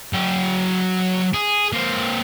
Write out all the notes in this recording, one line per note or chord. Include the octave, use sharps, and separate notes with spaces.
F#3 G5
G#4
A#3 C4